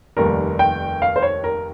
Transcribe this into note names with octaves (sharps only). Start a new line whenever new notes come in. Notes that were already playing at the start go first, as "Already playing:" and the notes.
F1 D#2 D#3 G3 A#4
G5
F5
C5
C#5
A#4